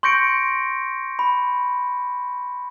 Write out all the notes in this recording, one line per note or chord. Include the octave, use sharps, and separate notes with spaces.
C6 C#6 G6 A#6 C#7 D7
B5